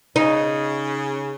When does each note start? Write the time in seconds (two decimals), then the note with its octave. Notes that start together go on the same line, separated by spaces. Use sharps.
0.16 C#3 D#4